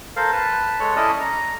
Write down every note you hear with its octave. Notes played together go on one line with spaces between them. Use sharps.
A4 A#4 C5 F5
B4 A5
G#3 A4 C#5
C#4 E4 A4 D5 D#5 A5
A#5